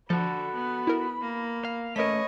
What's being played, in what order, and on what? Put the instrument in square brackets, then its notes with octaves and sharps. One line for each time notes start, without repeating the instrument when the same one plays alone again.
[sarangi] D3 [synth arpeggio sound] F3 [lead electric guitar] F#4 A4 [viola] B5
[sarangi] B3
[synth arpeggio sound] E4 A#4
[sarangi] A#3
[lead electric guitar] F5
[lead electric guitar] A3 C#4 [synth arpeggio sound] A#4 B6 [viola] B4 C#5 [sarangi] D#5